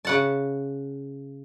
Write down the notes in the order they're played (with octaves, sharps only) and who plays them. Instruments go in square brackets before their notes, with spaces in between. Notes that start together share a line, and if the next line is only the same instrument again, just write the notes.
[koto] C#3 F#5 A5